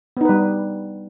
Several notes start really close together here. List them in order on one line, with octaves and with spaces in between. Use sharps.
B3 D#4 B4 G3